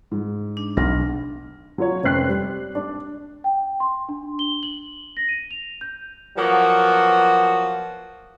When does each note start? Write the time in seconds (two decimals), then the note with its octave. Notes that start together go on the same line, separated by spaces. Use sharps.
0.11 G#2
0.57 D4
0.77 B1 F6 A#6
1.78 F#3 F4 C#5
2.04 F1 C4 C#4 G5 F#6 C7
2.29 G3
2.75 D4
3.44 G5
3.80 C6
4.09 D4
4.39 G7
4.63 F#7
5.17 A#6
5.29 D#7
5.51 F7
5.81 G6
6.37 F3 F#3 A#3 B3 F#4